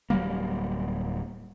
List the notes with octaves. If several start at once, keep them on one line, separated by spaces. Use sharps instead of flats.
D1 F#3 G3 A#3